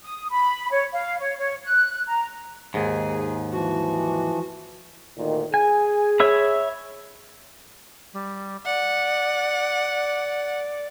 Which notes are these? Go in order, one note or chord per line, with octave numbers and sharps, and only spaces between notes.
D#6
B5
C#5
F5
C#5
C#5
F#6
A#5
D#2 G#2 G#4
E3 F3 F#4
D2 A#2 D#3
G#4 G#5
C#5 E5 B5
G3
D5 F#5